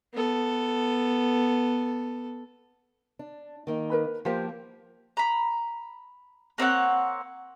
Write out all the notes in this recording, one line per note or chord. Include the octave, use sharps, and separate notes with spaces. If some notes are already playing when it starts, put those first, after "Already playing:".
B3 A4
D4
D#3 A#3 D#4
A#4 B4 B5
F3 A#3 F4 G4 C5
A#5 B5
A#3 C4 C#5 F#5